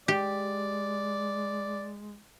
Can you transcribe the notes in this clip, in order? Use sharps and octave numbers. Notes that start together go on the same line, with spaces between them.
G#3 G4 D5